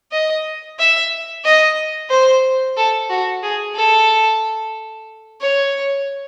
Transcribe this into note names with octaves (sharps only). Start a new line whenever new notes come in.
D#5
E5
D#5
C5
A4
F#4
G#4
A4
C#5